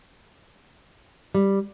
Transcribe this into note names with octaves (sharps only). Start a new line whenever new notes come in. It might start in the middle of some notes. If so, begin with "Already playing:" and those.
G3